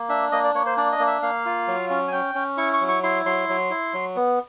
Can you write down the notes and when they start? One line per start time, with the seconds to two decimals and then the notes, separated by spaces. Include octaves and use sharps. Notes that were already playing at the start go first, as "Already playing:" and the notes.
Already playing: A#3
0.09 D4 E5
0.32 A#3 D#5
0.44 D5
0.54 A#3 C#5
0.66 C5
0.77 D4 D5
0.92 D#5
0.99 A#3
1.07 E5
1.22 A#3 F5
1.46 F4
1.68 F#3
1.90 C#4
2.08 G#5
2.12 C#4 G5
2.35 C#4
2.57 E4 C#6
2.73 C#6
2.81 F#3
2.88 C#6
3.03 E4 C6
3.26 F#3 C6
3.49 F#3
3.70 E4
3.94 F#3
4.16 B3